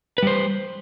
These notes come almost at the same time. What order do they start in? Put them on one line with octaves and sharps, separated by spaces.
B4 G3 C5